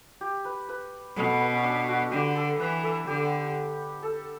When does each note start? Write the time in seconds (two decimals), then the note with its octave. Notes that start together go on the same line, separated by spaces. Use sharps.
0.21 G4
0.45 B4
0.69 B4
1.16 B2 A4
1.29 B3
1.41 B3
1.53 C#4
1.64 D4
1.89 F#4
2.11 D3 G4
2.36 A4
2.59 E3 B4
2.83 A4
3.07 D3 G4
4.03 A4